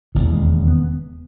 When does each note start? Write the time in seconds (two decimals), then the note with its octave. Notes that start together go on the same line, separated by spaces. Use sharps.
0.15 E1 D#2 C#3 E3
0.33 G#3
0.68 B3